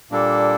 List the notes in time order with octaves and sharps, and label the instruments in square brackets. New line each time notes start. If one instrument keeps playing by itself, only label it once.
[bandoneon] A#2 G3 A#3 D4 A4